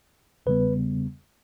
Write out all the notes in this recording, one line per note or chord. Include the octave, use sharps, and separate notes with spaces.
E2 C#3 G3 B3 B4